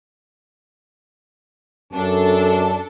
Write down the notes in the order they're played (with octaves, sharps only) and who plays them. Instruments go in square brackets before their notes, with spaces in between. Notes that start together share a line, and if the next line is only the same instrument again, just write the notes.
[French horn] F#2 [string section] D4 A4